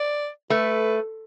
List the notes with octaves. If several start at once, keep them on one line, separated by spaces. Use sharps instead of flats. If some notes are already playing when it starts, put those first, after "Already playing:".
Already playing: D5
A3 B4